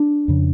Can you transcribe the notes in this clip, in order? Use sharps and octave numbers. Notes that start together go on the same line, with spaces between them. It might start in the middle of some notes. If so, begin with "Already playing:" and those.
Already playing: D4
F2 C#3